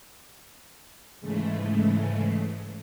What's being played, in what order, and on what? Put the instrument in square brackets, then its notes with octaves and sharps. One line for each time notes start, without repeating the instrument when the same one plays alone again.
[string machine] G#2 C#3 E3 G#3 A3